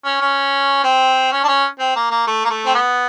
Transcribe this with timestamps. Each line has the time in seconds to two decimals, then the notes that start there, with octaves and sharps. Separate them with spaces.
0.05 C#4
0.21 C#4
0.84 C4
1.32 C#4
1.44 D4
1.48 C#4
1.79 C4
1.96 A#3
2.10 A#3
2.27 A3
2.44 A#3
2.50 A3
2.66 C4
2.75 B3